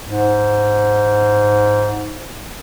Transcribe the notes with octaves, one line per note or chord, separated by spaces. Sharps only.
G#2